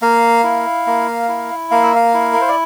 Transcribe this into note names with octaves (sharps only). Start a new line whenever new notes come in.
A#3 F5
E4
A#3
E4
A#3 F5
E5
F5
E4
A#4
C5
D5